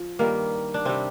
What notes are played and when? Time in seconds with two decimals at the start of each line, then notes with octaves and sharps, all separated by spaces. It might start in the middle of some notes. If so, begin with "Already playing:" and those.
Already playing: F3
0.19 G2 D#3 G3 A#3
0.74 D4
0.85 C3 G3 C4